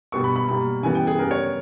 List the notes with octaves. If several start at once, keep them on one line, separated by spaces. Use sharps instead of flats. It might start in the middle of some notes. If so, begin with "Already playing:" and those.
B2 G3 B3 C#6
B5
B5
B2 G3 A#3 B5
C#3 E3 G3 B3 G#5
G5
G#4
C#3 G3 B3 A#4
C#5